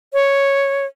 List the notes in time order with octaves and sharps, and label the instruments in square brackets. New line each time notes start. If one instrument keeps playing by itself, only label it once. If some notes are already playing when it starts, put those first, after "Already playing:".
[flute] C#5